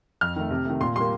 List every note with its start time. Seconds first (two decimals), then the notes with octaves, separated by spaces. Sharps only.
0.21 F2 F6
0.36 D#3 A3
0.50 C3
0.65 D#3 A3
0.81 A#2 C6
0.96 G3 A#3 C6